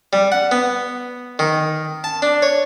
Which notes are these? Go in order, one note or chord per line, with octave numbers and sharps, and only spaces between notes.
G3
F#5
B3
D#3
A5
D4
C#5